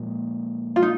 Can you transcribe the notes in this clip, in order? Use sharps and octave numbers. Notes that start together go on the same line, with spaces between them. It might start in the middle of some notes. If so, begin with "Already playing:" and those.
Already playing: A#2 F3 G#3
F4
D#4